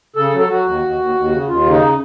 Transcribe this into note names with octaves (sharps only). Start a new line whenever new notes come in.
C#3 A4
F#3
A4
F#3 F#4
D#2
D#2
D#2
D#2
C#3
D#2 F4
C#3 D#4